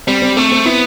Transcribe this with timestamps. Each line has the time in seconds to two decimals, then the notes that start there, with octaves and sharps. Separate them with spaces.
0.07 G3 C4
0.22 C4
0.37 A3 C4
0.52 C4
0.66 B3 E4